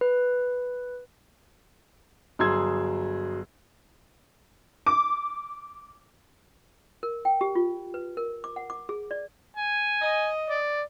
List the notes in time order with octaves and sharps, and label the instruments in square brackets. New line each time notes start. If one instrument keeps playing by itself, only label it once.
[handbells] B4
[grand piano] G1 F#3 G#4 C6 E6 G#6
[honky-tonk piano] D6
[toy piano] A#4
G5
G4
F4
B4
A#4
D6
F#5
D6
G#4
D5
[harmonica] G#5
[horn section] D#5
[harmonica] D5